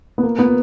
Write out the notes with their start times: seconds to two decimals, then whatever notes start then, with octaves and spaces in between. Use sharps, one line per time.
0.18 B3
0.23 A#3
0.39 B3